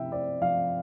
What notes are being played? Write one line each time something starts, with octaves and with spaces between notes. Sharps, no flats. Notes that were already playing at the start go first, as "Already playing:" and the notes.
Already playing: C3 F3 C4 E4 E5 G5
C4 D5
F3 F5